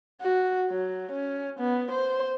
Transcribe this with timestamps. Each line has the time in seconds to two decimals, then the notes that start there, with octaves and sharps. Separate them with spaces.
0.21 F#4
0.70 F#3
1.12 C#4
1.59 B3
1.91 C5